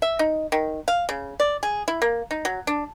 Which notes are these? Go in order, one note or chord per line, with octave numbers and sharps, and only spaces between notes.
E5
D#4
D#3
F5
C#3
D5
G#4
E4
A#3
D#4
F#3
D4